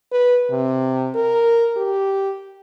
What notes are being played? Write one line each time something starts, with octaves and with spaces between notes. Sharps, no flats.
B4
C3
A#4
G4